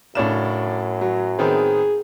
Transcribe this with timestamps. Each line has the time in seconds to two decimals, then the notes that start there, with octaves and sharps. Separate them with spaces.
0.15 F#2 A2 C#3 D4 C#5 E7
1.01 F#3
1.39 D#3 B3 C4 G#4